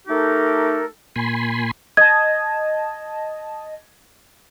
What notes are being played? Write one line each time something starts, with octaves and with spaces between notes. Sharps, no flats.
A3 D#4 G4 A4 A#4
A#2 G#5 B5 C6
D#5 A5 G#6